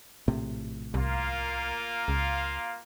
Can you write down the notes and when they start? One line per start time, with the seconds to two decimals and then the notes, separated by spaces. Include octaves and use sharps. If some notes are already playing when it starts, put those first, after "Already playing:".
0.28 A#1 A2 C3
0.94 C2 A#3 F4
2.08 C#2